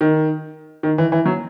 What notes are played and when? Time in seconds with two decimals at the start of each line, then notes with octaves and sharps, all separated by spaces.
0.01 D#3
0.83 D#3
0.98 E3
1.12 E3
1.26 F#3